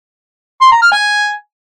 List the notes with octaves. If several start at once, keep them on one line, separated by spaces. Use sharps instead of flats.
C6
A#5
F6
G#5